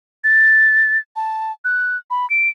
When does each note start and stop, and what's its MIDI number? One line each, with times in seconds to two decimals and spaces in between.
0.24 0.98 93
1.16 1.52 81
1.65 1.97 90
2.10 2.28 83
2.30 2.49 98